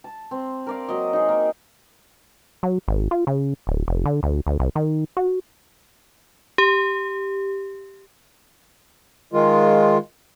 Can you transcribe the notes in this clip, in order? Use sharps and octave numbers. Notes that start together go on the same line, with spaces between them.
A5
C4
A#4 D5 F5
F#3 A#3 D#5
D#4 G#4
A#3
F#3
G#1
F4
C#3
D1
F1
D3
D2
D2
C2
D#3
F#4
G4
D#3 G#3 F4